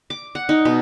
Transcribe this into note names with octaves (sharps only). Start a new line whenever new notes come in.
D6
F#5
D#4
B2